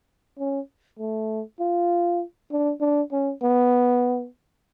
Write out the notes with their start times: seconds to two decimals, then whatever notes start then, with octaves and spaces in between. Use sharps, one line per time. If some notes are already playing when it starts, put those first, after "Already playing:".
0.39 C#4
0.99 A3
1.59 F4
2.51 D4
2.80 D4
3.12 C#4
3.42 B3